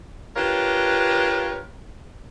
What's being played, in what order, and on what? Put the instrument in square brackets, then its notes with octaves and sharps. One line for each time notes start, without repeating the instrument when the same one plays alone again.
[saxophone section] D4 F4 G4 A#4 B4 C#5